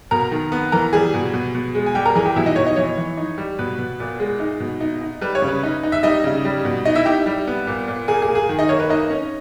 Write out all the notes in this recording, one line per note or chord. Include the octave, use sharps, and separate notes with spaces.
B2 A#4 A#5
D#3
B3
E3 A#4 A#5
G3 G#4 G#5
B2
B2
B2
G#3
G#5
G3 G4 G5
A#4 A#5
E3 G#4 G#5
G4 G5
B2 E4 E5
D#4 D#5
B2 C#5
D#4 D#5
E3 C#5
E3
D#4
G3
B2 B4
B2
A#2
G#3
D#4
B2
D#4
D#4
G3 B4
C#5
C#3
B4
D#4
D#4
E5
G3 D#4 D#5
C#3
G3
B2
D#4 D#5
E4 E5
D#4 G4 G5
G3
B3
A#2
A#2
A#3 G#4 G#5
G#4 G#5
A#3
G#4 G#5
D#3
D#4 D#5
A#3 C#5
B4
A#3 D#4 D#5
C#4